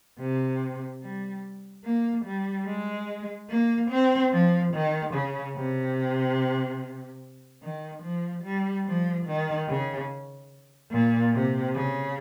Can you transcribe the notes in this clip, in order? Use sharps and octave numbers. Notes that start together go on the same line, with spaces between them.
C3
G3
A#3
G3
G#3
A#3
C4
F3
D#3
C#3
C3
D#3
F3
G3
F3
D#3
C#3
A#2
C3
C#3